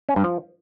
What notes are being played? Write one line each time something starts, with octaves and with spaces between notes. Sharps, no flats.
C#4
G2
F3